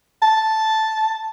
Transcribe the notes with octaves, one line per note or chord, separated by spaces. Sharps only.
A5